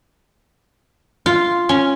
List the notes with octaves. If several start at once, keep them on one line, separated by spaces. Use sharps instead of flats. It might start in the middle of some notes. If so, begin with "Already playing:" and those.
F4
C#4